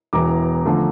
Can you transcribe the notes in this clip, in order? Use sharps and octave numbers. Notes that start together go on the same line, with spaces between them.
E1 E2 E3 A#5 D6
D3 F3 A3